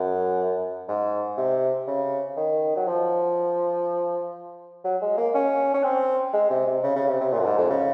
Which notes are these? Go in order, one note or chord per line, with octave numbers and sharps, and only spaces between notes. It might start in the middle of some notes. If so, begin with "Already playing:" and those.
Already playing: F#2
G#2
C3
C#3
D#3
F#3
F3
F#3
G#3
A#3
C#4
C#4
C4
G#3
C3
C3
C#3
C#3
C3
C3
A#2
F#2
G#2
F2
C#3